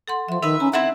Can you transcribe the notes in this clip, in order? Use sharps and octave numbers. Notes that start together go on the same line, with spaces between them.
A4 F#5 C6
F3 E5 C6
D#3 D#4 B4 E5
C#4 A#5
C4 E4 E5 F#5